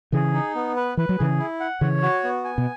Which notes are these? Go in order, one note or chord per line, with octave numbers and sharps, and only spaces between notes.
C#3 E3 G#4
D#4
B3
B4
E3 B4
F#3
C#3 E3 G#4
E4
F#5
C#3 E3 C#5
F#4
B3
G#5
B2